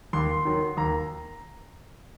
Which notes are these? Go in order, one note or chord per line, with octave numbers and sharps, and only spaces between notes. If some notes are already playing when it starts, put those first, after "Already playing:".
D#2 C6
D#3 F#3
D#2 A#5